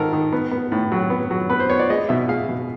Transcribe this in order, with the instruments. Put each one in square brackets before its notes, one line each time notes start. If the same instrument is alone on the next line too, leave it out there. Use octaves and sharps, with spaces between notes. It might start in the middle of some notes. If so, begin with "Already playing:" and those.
Already playing: [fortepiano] G#2 D#3 A4 A#4
D#3
B3
B3
A2
F#3
B3
F#3
B3 B4
C5
B3 C#5
D5
G#3 D#5
B2 E5
G#3 F5
B2